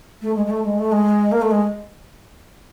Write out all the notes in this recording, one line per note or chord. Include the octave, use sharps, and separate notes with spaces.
A3
G#3
G#3
A3
G#3
A3
G#3
A#3
A3
G#3